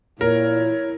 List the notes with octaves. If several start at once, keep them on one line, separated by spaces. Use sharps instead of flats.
A#2 E4 A#4 C#5